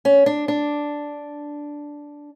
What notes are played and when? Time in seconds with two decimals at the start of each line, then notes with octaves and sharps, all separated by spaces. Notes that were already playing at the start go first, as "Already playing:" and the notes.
0.05 C#4
0.26 D4
0.48 D4